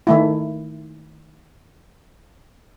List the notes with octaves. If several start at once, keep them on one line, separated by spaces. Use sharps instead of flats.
D#3 A3 E4